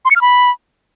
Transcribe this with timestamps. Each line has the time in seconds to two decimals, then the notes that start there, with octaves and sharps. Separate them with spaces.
0.05 C6
0.11 C#7
0.16 F6
0.21 B5